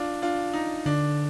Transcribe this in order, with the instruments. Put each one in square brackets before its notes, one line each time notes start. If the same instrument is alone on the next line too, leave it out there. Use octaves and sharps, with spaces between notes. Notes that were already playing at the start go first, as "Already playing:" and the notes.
Already playing: [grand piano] D4 F4
D4 F4
D#4
[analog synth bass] D3 [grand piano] D4